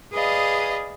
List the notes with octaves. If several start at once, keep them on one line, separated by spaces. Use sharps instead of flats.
G#4 B4 D5 D#5 F5